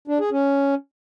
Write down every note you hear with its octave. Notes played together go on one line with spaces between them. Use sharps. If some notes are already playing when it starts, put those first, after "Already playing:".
D4
G#4
C#4